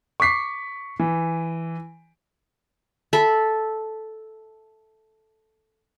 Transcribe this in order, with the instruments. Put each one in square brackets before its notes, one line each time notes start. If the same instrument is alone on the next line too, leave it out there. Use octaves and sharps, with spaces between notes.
[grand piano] C#6 D6 B6 C7
E3
[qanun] A4 E5 B5